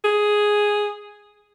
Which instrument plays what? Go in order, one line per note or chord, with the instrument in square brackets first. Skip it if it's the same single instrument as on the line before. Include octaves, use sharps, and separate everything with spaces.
[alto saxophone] G#4